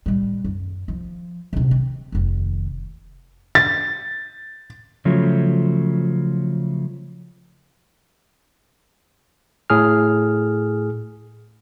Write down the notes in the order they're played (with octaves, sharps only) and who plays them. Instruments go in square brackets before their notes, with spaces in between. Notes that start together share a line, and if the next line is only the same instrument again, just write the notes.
[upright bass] A2 G3
F#2
F3
A#1 C3
C4
F1 D#2
[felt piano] A6
[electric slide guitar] C#3 F3 F#3 A3
[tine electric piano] A2 G#4 F6